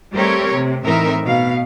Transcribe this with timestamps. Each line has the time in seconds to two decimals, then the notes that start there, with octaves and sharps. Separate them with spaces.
0.13 G3 A3 C4 G4 A#4 C#5
0.56 C3
0.85 A2 E3 C4 D#4 A#4 E5
1.25 B2 F5